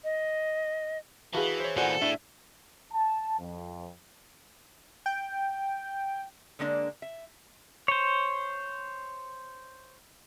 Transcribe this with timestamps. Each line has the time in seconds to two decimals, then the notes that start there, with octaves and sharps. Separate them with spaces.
0.04 D#5
1.34 E3 F#4 G#4 B4 F5 A5
1.60 C5 C#5
1.77 A#2 E3 F#4 A4 C5 D5 F#5 G#5
2.02 A2 D4 E5
2.93 A5
3.39 F2
5.06 G5
6.59 D3 G#3 A#3 D4
7.02 E5
7.88 C5 C#5